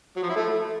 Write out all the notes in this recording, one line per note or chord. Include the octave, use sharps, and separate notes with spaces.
F#3
F3
E4
A3